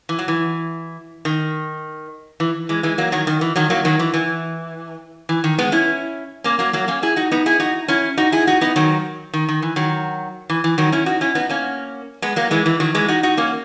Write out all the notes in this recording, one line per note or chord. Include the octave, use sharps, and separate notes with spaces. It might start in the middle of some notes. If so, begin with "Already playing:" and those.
E3
F#3
E3
D#3
E3
E3 G#3
E3 G#3
F#3 A#3
D#3 F#3
D#3
E3
D#3 F#3
F#3 A#3
D#3 F#3
E3
E3
E3
D#3
G#3 B3
C#4 E4
A#3 C#4
F#3 A#3
F#3 A#3
A#3 C#4
E4 G#4
D#4 F#4
B3 D#4
E4 G#4
D#4 F#4
C#4 E4
D#4 F#4
E4 G#4
D#4 F#4
B3 D#4
D#3 F#3
D#3
D#3
E3
D#3 F#3
E3
E3
D#3 F#3
C#4 E4
D#4 F#4
C#4 E4
B3 D#4
A#3 C#4
G#3 B3
F#3 A#3
E3 G#3
E3
D#3 F#3
E3 G#3
D#4 F#4
D#4 F#4
A#3 C#4